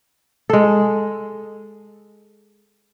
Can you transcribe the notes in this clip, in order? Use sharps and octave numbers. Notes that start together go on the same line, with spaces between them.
G#3 A4